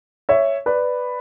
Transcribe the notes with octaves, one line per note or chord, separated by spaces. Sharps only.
C#5 E5
B4 D5